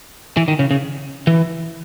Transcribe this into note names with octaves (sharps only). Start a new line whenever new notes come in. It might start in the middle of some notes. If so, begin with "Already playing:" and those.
E3
D#3
C#3
C#3
E3